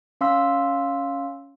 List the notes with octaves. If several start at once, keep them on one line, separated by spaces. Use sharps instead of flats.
C#4 F5 C6 E6 B6